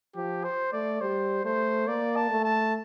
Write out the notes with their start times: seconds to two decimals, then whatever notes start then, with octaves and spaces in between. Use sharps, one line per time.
0.15 F3 G4
0.44 C5
0.73 A3 D5
1.01 G3 C5
1.45 A3 C5
1.87 A#3 D5
2.16 A5
2.30 A3
2.44 A5